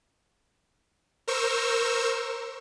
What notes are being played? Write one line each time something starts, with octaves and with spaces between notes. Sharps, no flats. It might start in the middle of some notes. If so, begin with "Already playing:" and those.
A#4 C5 C#6 E6